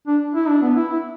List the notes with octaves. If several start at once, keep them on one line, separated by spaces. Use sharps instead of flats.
D4
E4
D4
B3
E4
E4